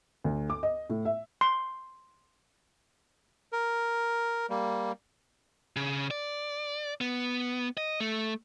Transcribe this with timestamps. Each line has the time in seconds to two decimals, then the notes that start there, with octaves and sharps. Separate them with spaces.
0.24 D2
0.50 D6
0.63 D#5
0.89 A2
1.05 E5
1.41 C6
3.53 A#4
4.50 G3 A#3
5.76 C#3
6.11 D5
7.01 B3
7.77 D#5
8.00 A3